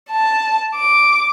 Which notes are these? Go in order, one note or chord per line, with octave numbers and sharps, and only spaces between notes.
A5
D6